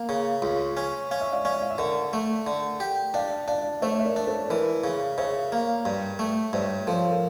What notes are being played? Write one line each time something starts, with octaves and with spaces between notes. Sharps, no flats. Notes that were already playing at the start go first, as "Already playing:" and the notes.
Already playing: A#3
C#3
C#2
C#4
C#4 F5
E5
D5 F5
C#4 D5 F5
F5
E5
D3 A#4 D5
A3
D3
G4
D4 D5 F5
D4 D5 F5
A3 C#5 E5
E5
A#4 D5
D4
A4 C#5
E3 A#4 D5
C#3
C#3 C#5 E5
A#3
G2
A3
G2 C#5 E5
F3 A4 C#5
A#4